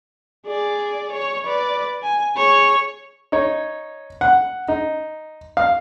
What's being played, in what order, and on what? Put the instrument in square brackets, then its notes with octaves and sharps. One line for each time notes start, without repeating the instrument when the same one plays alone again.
[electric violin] G#4 D5
C#5
B4 D5
G#5
G#4 C#5
[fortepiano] D#4 C#5
F#5
D#4
F5